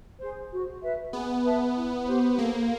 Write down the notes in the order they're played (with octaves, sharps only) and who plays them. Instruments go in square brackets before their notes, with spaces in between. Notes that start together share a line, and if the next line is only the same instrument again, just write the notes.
[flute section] G#4 C5
F#4
B4 E5
[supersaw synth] B3 [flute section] G#4
[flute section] B4 E5 A5
E4
G4 C5
[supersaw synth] A#3 [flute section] A4